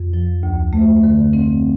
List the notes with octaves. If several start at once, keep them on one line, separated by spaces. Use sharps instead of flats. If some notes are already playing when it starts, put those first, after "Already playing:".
Already playing: F2
F3
D2
A3
D3
C4